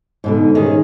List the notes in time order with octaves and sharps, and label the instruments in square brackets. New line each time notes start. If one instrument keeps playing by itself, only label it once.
[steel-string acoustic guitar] G#2 B2 D3
D#3 C#4 G#4